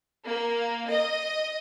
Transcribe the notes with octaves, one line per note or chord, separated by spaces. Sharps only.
A#3
D#5